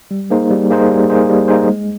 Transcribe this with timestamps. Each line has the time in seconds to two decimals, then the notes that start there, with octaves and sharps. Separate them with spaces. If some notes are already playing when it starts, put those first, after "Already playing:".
0.11 G3
0.30 A#3 D#4 G#4 C5
0.51 G3
0.70 A#3 D#4 G#4 C5
0.90 G3
1.10 A#3 D#4 G#4 C5
1.29 G3
1.48 A#3 D#4 G#4 C5
1.68 G#3